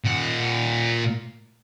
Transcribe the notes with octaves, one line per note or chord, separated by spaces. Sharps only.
A#2 F#5